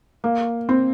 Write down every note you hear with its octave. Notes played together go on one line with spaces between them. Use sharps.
A#3
C4